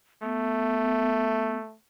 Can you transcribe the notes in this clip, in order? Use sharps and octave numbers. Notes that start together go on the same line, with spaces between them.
A3 B3